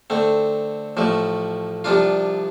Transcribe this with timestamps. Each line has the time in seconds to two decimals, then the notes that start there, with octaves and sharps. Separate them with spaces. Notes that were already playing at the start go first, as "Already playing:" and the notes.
0.10 D3 A3 C4
0.97 A1 A2 F3 A3
1.84 C2 C3 F3 D4 F4